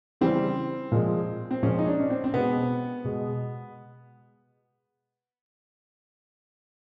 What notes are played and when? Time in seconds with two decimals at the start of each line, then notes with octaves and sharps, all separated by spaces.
0.21 C#3 E3 G3 C4
0.92 A#2 F3 G#3
1.51 C4
1.63 A#2 F3 G#3 C#4
1.79 D#4
1.86 D4
2.00 C#4
2.10 C4
2.24 C4
2.33 B2 G#3 B3
3.04 B2 G#3